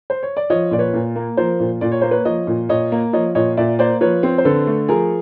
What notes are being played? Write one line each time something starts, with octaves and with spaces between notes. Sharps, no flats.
C5
C#5
D5
F3 C#5 D#5
A#2 D5
B4 C#5
A#2
A#3
F3 A#4 C5
A#2
A#2 D5
C#5
A#3 C5
B4 C#5
F3 C#5 D#5
A#2
A#2 C#5 D#5
A#3
F3 C#5 D#5
A#2 C#5 D#5
A#2 D5 E5
A#3 C5 D5
F3 B4 C#5
C4
C5
D3 A4 B4
A3
F3 G#4 A#4